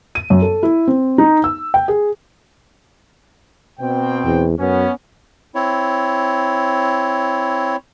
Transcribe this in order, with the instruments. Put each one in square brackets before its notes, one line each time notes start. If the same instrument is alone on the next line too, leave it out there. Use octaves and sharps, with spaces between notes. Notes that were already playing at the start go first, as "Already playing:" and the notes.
[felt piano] D#7
F#2
A4
E4
C4
D#4
E6
G5
G#4
[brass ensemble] B2 C4 G5
[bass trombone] E2
[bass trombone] F#2 [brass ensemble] B3 C#4
[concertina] C4 E4 C#5